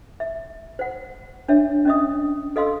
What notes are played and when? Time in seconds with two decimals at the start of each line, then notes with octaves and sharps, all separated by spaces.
0.20 E5
0.79 C5 F#5
1.49 D4 C#5 E5
1.85 C#4 D4 D#5 E5 D#6
2.56 A4 D#5 F5 C6 E6